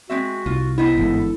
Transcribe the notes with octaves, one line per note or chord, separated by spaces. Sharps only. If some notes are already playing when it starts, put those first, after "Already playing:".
G#3 C4 F#4 E5
C2 F4
B3 D#4 E4 C5
G1 G#2 E3 A4